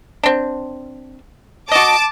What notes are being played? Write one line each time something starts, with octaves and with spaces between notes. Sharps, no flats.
C4 D4
F#4 D#5 A5 D6